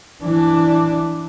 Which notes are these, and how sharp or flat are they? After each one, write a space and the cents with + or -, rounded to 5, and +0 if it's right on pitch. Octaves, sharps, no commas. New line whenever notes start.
E3 +0 D4 +0